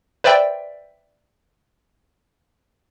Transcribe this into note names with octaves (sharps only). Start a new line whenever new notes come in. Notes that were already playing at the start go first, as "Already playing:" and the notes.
B4 C5 D5 E5 G5